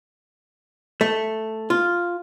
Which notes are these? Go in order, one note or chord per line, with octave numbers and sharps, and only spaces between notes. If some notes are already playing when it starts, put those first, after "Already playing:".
A3
F4